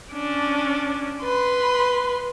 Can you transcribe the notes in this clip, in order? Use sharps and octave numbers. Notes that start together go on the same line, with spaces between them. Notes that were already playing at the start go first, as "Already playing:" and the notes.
C#4 D4
B4 C6